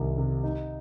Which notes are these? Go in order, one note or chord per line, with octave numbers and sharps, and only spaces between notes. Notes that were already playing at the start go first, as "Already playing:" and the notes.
Already playing: C2 D#3 G3
C3
D#4